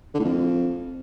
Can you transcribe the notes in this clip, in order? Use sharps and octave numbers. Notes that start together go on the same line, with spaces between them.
D3
A2
F2